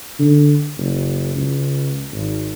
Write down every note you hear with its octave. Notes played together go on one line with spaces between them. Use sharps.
D3
F#1
C#2
G#1